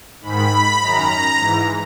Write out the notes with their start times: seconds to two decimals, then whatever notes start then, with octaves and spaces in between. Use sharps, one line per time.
0.21 G#2 D#3 B5
0.79 F#2 A#5
0.84 D#3
1.37 G#2 E3